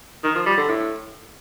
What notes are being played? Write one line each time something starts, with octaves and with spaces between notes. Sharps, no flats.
D#3
F3
G3
D3
A2